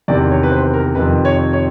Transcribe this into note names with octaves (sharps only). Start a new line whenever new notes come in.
E2 C3 D#3 D5
C#5
B4
C5
A#4
F2 C3 D#3 B4
C#5
C#5